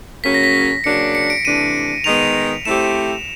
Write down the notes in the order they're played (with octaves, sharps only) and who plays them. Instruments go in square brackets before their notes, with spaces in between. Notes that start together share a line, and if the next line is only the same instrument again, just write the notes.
[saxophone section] C#3 F#3 A#3 C#4 [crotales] B6
[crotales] A#6
B6
[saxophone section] C#3 F#3 A#3 D4 [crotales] C#7
[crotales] C#7
D7
[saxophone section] C3 E3 A3 D4 [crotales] D#7
[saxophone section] D#3 G#3 B3 [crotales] F7
[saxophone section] A3 C4 E4 G4 C5 [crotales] E7